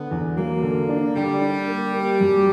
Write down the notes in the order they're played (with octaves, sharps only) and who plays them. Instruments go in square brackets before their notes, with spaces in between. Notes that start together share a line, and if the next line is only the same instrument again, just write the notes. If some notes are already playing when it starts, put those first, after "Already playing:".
Already playing: [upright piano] D3 [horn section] B3
[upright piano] E2
[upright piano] F#3 [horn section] A#3
[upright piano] D3
D4
[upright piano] D3 [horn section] G3
[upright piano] D4
A#3
A#3
F#2